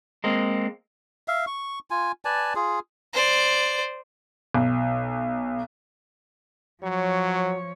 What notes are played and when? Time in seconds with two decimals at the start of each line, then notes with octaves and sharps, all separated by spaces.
0.24 G#3 A#3 C4
1.28 E5 F5
1.47 C#6
1.90 F4 G#5
2.25 B4 D5 G#5 A5
2.55 F4 G#4
3.13 C5 D5
4.54 B1
6.83 F3 F#3 C#5